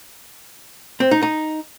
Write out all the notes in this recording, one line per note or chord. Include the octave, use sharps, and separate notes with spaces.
C4
D#4
D#4